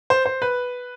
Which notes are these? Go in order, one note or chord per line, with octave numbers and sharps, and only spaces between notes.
C5
C5
B4